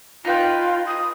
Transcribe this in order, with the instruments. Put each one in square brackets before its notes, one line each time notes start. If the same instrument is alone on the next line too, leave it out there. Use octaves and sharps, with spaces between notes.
[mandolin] D#4 B4 G5 [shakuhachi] F4
[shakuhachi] D#6